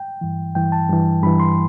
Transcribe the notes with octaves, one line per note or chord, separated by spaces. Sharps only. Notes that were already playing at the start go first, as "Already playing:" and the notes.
Already playing: G5
G2 E3
G2 E3 G5
A5
G2 E3
G2 E3 B5
C6